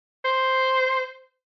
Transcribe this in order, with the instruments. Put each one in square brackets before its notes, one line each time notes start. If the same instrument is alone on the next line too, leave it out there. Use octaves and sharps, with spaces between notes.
[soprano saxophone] C5